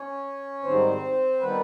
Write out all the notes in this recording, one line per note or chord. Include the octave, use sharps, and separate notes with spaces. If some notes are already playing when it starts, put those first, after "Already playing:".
Already playing: C#4 C#5
G#2 D#3 G3 C4 C5
D#3 G3 B3 B4